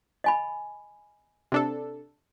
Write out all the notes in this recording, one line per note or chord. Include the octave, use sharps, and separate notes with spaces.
D#5 G#5 B5
C3 D4 A4